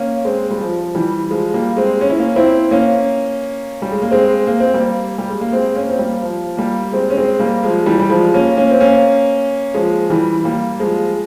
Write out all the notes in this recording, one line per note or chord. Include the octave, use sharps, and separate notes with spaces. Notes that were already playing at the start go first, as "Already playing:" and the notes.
Already playing: A#3 C#4
G#3 C4
G3
F3
E3 G3
F3 G#3
G3 A#3
G#3 C4
C#4
E4
A#3 C#4
C4 E4
A#3 C#4
G3
G#3
A#3
G#3 C4
A#3
C4
G3 A#3
G3
G#3
A#3
G#3 C4
A#3 C#4
C4
G3 A#3
F3
G3 A#3
G#3 C4
C#4
G#3 C4
G3 A#3
F3 G#3
E3 G3
G3
F3 G#3
A#3 C#4
A#3 C#4
C4
A#3 C#4
F3 G#3
E3 G3
G3 A#3
F3 G#3